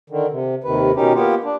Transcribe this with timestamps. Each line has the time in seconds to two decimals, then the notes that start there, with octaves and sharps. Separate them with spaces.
0.10 D3 D#3
0.31 C3
0.64 D#2 C3 D#3 B4
0.96 B2 D#3 C#4 D#4 G4
1.14 A#3 B3 F4 G4
1.44 D4